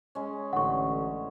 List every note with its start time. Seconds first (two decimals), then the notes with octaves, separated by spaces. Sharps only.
0.15 G#3 C#4
0.53 A1 D3 F#5 C#6